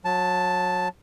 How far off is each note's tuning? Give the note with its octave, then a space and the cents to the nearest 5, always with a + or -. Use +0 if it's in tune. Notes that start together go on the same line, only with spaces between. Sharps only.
F#3 -25 A5 +0